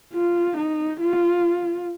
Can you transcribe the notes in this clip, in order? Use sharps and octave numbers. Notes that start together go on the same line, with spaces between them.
F4
D#4
F4